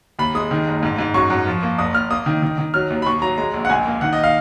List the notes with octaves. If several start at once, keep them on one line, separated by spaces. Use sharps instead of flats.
D#2 B5
G#3 D#6
D#3
F#1
G#2
G#2
F#2 C#6
F#2
F3
A#3
F#1 D#6
F#1 F6
A#3 D#6
D#3
D#3
D#3
F#3 F6
D#2
B5
D#2 C#6
F#3 A#5
G#3 A#5
A#1
F#5
C#2 G#5
A#3
D#3 F#5
D#5
F5